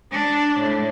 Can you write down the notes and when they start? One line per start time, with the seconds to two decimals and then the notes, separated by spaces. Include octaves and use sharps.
0.12 D4
0.60 A2